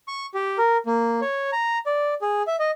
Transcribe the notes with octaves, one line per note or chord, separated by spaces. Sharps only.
C#6
G4
A#4
A#3
C#5
A#5
D5
G#4
E5
D#5